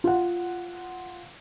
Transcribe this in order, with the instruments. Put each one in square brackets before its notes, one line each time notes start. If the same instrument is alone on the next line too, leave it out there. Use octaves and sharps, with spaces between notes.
[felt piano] F4 F#5